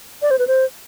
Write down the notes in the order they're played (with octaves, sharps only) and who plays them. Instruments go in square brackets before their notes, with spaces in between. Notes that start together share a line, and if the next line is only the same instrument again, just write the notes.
[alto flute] D5
C5
B4
C5